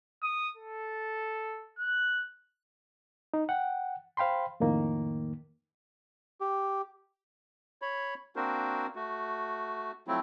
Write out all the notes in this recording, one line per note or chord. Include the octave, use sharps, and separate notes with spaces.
D#6
A4
F#6
D#4
F#5 G5
C5 F5 G5 B5 C6
F2 A2 D#3 A#3
G4
C#5 B5
A#3 C4 D4 F#4 A#4 C5
A3 F#4
F3 F#3 A3 C4 E4